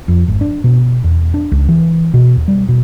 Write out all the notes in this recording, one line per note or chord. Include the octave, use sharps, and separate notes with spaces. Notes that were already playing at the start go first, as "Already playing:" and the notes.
F2
G#1
D4
B2
E2
D4
C#2
E3
B2
D#2
G3
B2